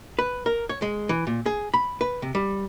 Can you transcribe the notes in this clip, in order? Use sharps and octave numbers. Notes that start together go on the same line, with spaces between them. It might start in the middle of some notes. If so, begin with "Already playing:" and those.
B4
A#4
C#5
G#3
E3
A#2
G#4
B5
B4
C3
G3